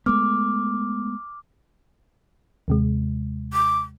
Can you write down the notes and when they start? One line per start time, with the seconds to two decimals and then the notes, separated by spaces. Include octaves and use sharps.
0.06 G#3 A3 B3 D6 F6
2.68 D#2 C3 G#3
3.53 D6